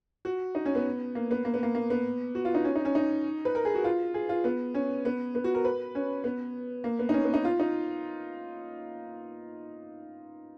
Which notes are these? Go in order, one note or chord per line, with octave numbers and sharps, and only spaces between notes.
F#4
D#4
C#4
B3
A#3
B3
A#3
B3
A#3
A#3
B3
F#4
F4
D#4
C#4
D#4
C#4
D#4
B4
A#4
G#4
F#4
F4
G#4
F4
B3
C#4
B3
B3
F#4
A#4
B4
C#4
B3
A#3
B3
D#4
C#4
B3
D#4
F4
D#4